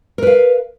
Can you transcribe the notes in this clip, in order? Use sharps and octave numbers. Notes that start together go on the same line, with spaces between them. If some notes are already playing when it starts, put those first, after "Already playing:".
A#4 B4 F5